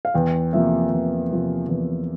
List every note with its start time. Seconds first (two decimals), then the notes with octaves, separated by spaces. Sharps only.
0.05 F5
0.14 E2 G5
0.53 C3 F3 A#3 E5
0.92 E2
1.30 C3 F3 A#3
1.68 E2